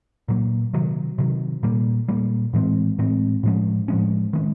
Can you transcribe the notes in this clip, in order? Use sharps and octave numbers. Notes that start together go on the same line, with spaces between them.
A#2 F#3 A#3
C3 D#3 F#3
C3 D#3 F#3
A#2 G3 A#3
A#2 G3 A#3
A2 E3 G#3 C4
A2 E3 G#3 C4
A2 F3 G#3 C#4
A2 F3 G#3 C#4
D#3 G#3 C#4